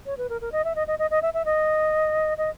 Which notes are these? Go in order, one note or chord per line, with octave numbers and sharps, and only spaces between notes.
C#5
B4
A#4
A#4
D#5
E5
D#5
D#5
D#5
D#5
E5
E5
D#5
D#5